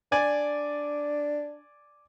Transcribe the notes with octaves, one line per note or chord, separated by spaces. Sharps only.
D4 D5 G#5